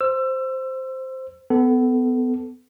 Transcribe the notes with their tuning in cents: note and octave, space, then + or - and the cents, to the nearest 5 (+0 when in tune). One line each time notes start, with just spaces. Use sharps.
C5 +0 E6 +25
B3 +25 A4 +0